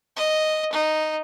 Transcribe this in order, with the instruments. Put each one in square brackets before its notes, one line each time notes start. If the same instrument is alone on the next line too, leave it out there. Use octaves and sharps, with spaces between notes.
[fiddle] D#5
D#4